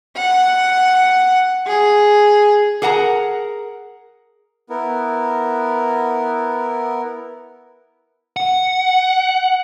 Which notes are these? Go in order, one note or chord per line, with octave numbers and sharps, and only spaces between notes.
F#5
G#4
G#4 A#4 F#5 A5 A#5
B3 E4 A#4
F#5